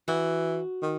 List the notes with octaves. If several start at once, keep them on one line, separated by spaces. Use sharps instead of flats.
E3 F#4
D#3